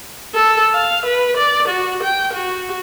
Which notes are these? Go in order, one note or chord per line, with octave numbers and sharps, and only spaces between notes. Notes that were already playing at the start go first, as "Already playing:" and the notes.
A4
F5
B4
D5
F#4
G5
F#4